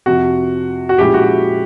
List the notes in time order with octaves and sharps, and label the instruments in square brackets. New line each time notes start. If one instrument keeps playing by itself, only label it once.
[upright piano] F2 C3 F3 [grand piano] F#4
[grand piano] F#4
[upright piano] A#2 F3 G#3 C#4 E4 [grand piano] G4
[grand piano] F#4